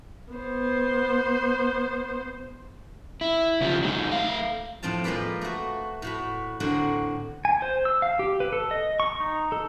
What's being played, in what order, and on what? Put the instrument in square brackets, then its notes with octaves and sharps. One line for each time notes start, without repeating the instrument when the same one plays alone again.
[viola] B3 C5
[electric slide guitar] E4
C#3 F3 C#4 F4 G4
F#3 G#3 D#4
A3 F5
[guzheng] F2 A2 C4 F4 A5
F3 G#3 A#3 B4 D5
A3 F#4
A2 F#4 B5
A2 D3 C4 F#4 A#4 F#5
[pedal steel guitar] G#5
C5
E6
F5
G4
B4
A4
D#5
C#6
D#4
A4